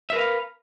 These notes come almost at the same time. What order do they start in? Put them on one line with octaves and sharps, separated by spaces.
E5 A#4 B4 F5